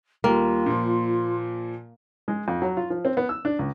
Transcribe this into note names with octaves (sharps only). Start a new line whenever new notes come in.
D#2 G3 A#3 F4
A#2 F3
G#3
F2
F#3
F4
F3
C4
B3
E6
D4
C#2